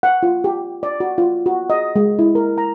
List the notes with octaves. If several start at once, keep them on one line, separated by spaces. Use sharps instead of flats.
F#5
F4
G4
D5
F#4
F4
F#4
D#5
G#3
E4
A#4
A#5